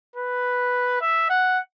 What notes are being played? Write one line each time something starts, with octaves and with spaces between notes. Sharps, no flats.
B4
E5
F#5